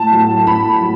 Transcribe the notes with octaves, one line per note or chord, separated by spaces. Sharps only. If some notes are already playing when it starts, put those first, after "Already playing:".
Already playing: A2 A5
F#3 A3
A2 B5
F#3